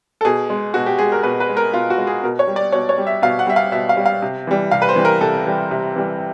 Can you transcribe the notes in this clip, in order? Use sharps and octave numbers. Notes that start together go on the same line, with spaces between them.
A4
B2 G#4
G#3
B2 F#4
G4
G#3 G#4
A#4
B2 B4
B4
G#3
A#4
B2 F4
F#4
G#3
G#4
B2 A#4
C#5
G3
D5
B2 C#5
C#5
G3
E5
B2 F5
F#5
G3 E5
F5
B2 E5
F5
G3
F5
C3
E3 G3
C3 F5
B4
C5
E3 G3
A#4
C3 A4
E3 G3
C3
E3 G3